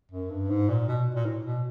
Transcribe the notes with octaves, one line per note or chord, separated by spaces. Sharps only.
F#2
G2
G#2
A#2
B2
A#2
A2
B2